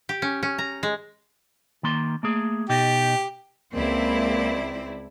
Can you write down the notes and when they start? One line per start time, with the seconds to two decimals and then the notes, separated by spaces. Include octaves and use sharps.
0.09 G4
0.22 C#4
0.43 C#4
0.58 A#5
0.83 G#3
1.83 D#3 A#3 C6
2.23 A3 A#3 G#4
2.69 B2 D#4 G4
3.73 C#2 A#3 C4 E4 D5